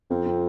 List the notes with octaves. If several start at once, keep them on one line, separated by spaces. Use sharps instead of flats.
F2 C4
C4